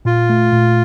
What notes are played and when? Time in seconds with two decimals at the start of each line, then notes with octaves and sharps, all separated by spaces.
0.05 A#2 F4
0.29 A3
0.53 A#2